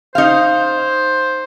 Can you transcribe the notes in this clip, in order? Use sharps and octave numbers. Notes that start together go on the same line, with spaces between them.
D#4 C5 F5